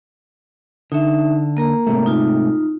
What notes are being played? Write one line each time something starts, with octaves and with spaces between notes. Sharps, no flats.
D3 D#4 E5
A#3 A#4 A#5
G#2 C3 A3
D#4 F4